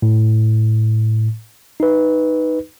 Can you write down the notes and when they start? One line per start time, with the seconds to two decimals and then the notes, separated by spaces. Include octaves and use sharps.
0.02 A2
1.80 D#4 B4